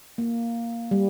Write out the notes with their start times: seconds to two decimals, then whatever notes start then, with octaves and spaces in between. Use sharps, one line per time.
0.18 A#3
0.91 G3